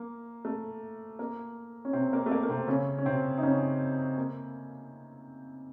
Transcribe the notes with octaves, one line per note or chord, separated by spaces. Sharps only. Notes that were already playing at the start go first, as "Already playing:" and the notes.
Already playing: A#3
A3
A#3
C#4
C3 C4
A#3
A3
A#3
A#3
C3 C4
C#3 C#4
C#4
C3 C4
D#4
C#3 C#4
A#3